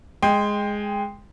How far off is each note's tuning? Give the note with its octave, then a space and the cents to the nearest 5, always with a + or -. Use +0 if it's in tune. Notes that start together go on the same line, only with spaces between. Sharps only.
G#3 +0 G5 +20